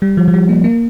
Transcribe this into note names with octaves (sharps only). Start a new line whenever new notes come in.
G3
F3
F3
G3
A#3
A#3